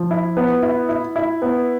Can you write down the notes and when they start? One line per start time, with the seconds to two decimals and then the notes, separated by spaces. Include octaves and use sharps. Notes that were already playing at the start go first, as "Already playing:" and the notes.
Already playing: F3
0.11 E4
0.37 B3
0.62 E4
0.89 E4
1.16 E4
1.42 B3